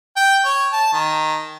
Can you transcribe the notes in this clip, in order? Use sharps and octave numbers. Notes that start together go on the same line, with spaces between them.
G5
C#5
A5
D#3